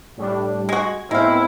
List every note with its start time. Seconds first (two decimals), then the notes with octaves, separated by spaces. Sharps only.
0.17 A2 G3 D4
0.69 G#3 F#4 G#6
1.11 A2 G#3 B3 C4 E4 F5